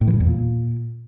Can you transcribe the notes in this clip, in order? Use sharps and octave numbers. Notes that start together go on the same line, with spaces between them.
A2
E3
G2
E2
A#2